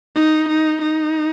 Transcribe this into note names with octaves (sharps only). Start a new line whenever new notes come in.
D#4
D#4
D#4